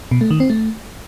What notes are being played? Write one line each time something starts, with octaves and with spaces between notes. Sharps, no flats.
B2
A3
D#3
C4
A3